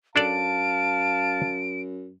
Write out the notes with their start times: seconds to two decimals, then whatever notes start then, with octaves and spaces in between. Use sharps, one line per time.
0.16 F#2 D4 A4 D5 F5 A5 D7